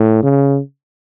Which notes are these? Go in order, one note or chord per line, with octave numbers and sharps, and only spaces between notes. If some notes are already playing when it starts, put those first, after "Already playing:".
Already playing: A2
C#3